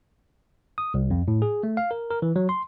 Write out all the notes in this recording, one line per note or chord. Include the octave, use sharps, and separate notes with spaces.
D#6
C2
F2
A2
G#4
A3
F5
A#4
A#4
E3
F#3
C6